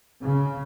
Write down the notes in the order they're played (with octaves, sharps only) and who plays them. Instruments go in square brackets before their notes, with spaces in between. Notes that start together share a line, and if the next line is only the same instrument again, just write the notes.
[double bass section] C#3